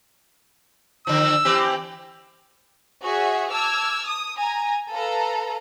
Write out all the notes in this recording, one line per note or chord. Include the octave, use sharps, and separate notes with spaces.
D3 F3 E6
E3 C4 G4
F#4 G#4 C#5 E5
A5 D6 E6 F6 G#6
D#6
G#5 A#5
A4 B4 F5 A#5